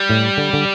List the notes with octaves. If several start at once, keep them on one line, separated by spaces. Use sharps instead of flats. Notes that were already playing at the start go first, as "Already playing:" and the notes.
Already playing: G3
A2
D3
D3